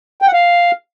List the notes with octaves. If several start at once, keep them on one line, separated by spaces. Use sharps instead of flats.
G5
F#5
F5